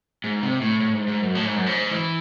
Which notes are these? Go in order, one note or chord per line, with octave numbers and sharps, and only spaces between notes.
G#2
C3
A2
A2
G#2
G#2
F#2
A2
G#2
F#2
G#2
E3